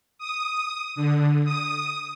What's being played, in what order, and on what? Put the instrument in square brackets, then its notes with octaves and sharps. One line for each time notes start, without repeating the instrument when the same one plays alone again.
[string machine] D#6
D3
D#6